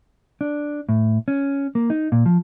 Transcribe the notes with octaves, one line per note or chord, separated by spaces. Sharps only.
D4
A2
C#4
A#3
D#4
A#2
F3